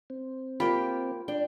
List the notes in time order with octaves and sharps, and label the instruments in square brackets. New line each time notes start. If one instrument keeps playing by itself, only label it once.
[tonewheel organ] C4
[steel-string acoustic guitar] A#3 G4 [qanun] F4 G5 [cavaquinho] B5
[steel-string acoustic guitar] D4 [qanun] G5